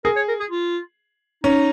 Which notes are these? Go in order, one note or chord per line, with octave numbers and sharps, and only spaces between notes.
G#4 A#4
C#5
A#4
G#4
F4
C#4 D#4